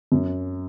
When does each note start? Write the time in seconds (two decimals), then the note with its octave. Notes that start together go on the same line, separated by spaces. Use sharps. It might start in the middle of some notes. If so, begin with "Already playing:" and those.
0.12 F#2